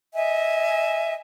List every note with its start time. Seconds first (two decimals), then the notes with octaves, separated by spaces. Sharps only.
0.15 D#5 E5 G#5